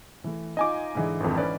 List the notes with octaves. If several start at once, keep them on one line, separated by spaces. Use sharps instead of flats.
E3 A3
D#4 F4 D#5 G#5 D6
G#2 D3 E3
G#1 F2
C#4 B4 D5